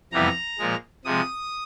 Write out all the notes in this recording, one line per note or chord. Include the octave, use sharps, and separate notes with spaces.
F2 C3 E3 G3 B3 A#5
A#2 F3 G#3
C3 F3 G#3 D#6